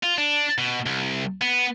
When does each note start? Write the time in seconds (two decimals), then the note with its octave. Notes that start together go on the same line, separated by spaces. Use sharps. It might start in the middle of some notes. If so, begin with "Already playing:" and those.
0.03 F4
0.18 D4
0.58 B2
0.86 C2
1.41 B3